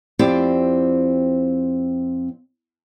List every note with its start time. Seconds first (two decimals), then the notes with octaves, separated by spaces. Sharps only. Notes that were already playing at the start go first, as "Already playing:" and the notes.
0.19 F2 C4 E4 G4 D5